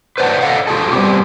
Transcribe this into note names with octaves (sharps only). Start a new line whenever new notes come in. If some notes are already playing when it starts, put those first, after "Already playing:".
B4 C5 D5 F#5 A5
A4 D5 D#5 F5 F#5
F4 F#4 G#4 A4
G3 B3 C4 G4